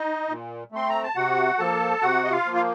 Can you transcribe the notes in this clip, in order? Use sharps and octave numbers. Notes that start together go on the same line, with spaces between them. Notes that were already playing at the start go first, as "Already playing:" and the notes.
Already playing: D#4 D#5
A#2
A3 C4 C6
A#5
A5
C3 F#4 F#5
F3 A#3 A4 A5
C3 F#4 F#5
D#5
F4 F5
F3 A#3
F5